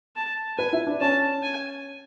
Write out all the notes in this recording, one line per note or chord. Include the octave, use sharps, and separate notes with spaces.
A5
B4 G#5
E4
D4
C#4 A5
G#5